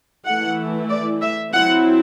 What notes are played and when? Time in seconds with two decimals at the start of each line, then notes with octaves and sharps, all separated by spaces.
0.26 E3 A3 E4 F#5
0.89 D5
1.21 E5
1.53 F#3 C4 E4 F#5